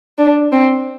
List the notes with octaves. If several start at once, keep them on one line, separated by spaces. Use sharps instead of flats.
D4
C4